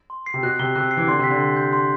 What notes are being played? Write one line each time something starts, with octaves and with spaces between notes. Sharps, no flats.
C6
C7
C3
B2 F#6
C3 G7
C3 F#6
C7
E3
D3 C6
C3
B6
D3
C6
G6
C6